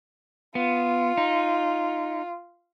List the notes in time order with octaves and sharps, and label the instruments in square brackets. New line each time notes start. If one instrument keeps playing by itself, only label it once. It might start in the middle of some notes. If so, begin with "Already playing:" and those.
[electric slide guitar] B3 [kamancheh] F4
[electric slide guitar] D#4